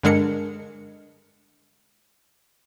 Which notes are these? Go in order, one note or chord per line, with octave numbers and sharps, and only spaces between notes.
G2 D3 G#3 D4 A#4 C#7